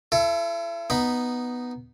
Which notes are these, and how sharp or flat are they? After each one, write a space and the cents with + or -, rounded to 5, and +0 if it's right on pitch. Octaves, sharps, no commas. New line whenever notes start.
E4 +40 A4 +10
B3 +0 D#4 +0 B5 +0